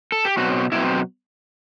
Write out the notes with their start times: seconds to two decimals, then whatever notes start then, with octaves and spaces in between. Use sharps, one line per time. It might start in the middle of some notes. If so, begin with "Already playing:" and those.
0.12 A4
0.25 G4
0.37 B2 F#3 C4 F#4
0.72 B2 F#3 C4 E4